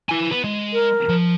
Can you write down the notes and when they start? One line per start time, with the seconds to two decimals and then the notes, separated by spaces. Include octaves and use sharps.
0.09 E4 G#5
0.31 B3
0.44 G#3
0.73 A#4
1.09 F3